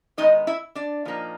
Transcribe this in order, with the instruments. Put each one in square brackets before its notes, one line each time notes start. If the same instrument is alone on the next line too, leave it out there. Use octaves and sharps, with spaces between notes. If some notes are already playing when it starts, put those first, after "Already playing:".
[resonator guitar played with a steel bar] D#3 G#3 B3 D#4 D#5
E4 E5
D4 D5
A#2 F3 A#3 D#4